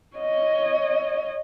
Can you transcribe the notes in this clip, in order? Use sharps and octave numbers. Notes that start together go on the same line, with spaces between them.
C#5 D#5